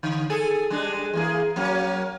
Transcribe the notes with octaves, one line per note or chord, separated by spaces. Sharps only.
D3
G#4 A4
G3 G#3 D4
E3 A#3 G#4
F#3 A#3 C#4